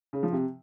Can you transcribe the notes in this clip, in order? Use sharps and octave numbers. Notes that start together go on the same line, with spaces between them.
C#3
F3
C3